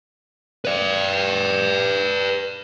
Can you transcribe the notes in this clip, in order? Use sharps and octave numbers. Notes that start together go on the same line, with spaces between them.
B4 D5